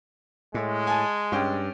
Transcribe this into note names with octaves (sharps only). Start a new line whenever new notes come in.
A2 G#3
G#5 A5
G2 C#4 G5